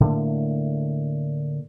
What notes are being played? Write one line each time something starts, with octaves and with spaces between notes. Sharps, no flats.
A2 D3 A3 A#3